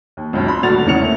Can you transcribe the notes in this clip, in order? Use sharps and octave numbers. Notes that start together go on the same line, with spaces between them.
D#2
C#2 F#2 B2
D4 B5 C6
D#1 D2 F#4 D5 A6 F7
E1 E2 C#3 C#4 C#7 F7
A3 A#3